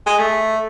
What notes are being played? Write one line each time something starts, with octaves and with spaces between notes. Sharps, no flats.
G#3
A3